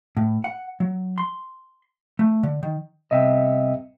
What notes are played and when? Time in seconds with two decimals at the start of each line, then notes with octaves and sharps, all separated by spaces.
0.17 A2
0.44 F#5
0.80 F#3
1.18 C6
2.19 A3
2.43 D3
2.63 D#3
3.11 C2 C3 B3 D#5 E5 G5